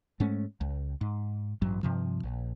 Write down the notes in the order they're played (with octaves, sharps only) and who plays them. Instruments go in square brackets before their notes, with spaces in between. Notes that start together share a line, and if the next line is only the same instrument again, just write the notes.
[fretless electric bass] G#2 G#3 A3 C#4
C#2
G#2
A1 G2 F#3
G2 C3 F3
A#1